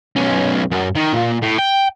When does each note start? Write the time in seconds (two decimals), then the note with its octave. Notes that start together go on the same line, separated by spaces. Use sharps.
0.16 B1 C#4
0.71 F#2
0.95 D#3
1.13 A#2
1.42 A2
1.58 G5